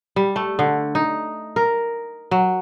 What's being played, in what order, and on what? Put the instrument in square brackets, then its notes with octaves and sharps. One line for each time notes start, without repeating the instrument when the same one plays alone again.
[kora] G3
A3
D3
D#4
A#4
F#3